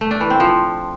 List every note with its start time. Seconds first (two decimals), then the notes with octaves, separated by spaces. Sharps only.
0.01 A3
0.11 D4
0.21 E3
0.30 C4
0.40 F3